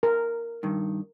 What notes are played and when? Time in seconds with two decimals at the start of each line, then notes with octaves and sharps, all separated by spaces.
0.03 A#4
0.63 G2 D#3